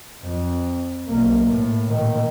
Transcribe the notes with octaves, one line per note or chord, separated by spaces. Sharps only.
F2
B1 A#3
A2
A#2 D#3